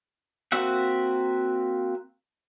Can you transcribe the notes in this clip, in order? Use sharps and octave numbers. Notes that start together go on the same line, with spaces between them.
A#3 C4 F#4 E5 F#5